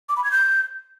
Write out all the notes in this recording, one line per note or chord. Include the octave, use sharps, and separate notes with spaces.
D6
B5
G#6
G6